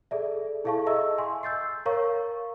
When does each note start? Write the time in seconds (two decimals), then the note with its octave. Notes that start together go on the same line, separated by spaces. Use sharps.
0.11 G#4 A4 D5 E5
0.64 E4 G#4 A4 F5 A5 C#6
0.87 D#5 E5 A#5 C#6 E6
1.18 G#5 C6
1.43 E6 G6 A6 C7
1.86 A#4 C#5 F5 A#5 C#6